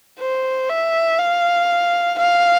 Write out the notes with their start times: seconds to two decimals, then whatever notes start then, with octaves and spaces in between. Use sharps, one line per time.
0.19 C5
0.69 E5
1.19 F5
2.18 F5